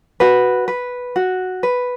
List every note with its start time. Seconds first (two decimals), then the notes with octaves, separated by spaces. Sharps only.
0.20 F#4 B4
0.68 B4
1.16 F#4
1.63 B4